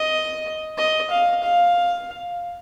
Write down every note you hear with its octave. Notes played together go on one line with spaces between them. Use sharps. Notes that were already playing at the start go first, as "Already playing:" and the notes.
Already playing: D#5
D#5
F5
F5